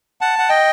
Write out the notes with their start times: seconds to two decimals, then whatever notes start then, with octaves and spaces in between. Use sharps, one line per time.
0.21 F#5 A5
0.39 F#5
0.49 D#5 G5